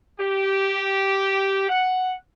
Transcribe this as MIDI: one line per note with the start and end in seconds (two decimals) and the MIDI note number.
0.19 1.68 67
1.69 2.14 78